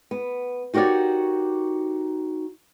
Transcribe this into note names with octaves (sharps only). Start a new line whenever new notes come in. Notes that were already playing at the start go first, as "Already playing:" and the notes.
B3
D#4 F#4 G4 A#4 C#5 D5